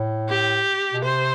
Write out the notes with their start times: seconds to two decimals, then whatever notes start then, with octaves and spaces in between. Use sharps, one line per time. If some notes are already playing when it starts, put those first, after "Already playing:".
Already playing: A2
0.29 G4
0.93 B2
1.03 C3 C5